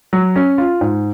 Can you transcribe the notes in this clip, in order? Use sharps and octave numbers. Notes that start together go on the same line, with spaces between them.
F#3
C#4
F4
G#2